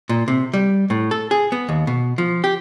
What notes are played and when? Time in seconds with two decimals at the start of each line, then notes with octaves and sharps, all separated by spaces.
0.09 A#2
0.28 C3
0.54 G3
0.90 A2
1.11 A4
1.31 G#4
1.52 B3
1.69 D#2
1.87 B2
2.18 F3
2.44 G4